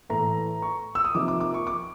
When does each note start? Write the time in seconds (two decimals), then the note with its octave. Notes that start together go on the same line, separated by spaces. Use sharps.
0.09 A2 E3 A3 A#5
0.62 C#6
0.95 E6
1.05 D#6
1.15 C3 F3 A#3 D#4 D6
1.28 D6
1.41 D6
1.54 C#6
1.67 D6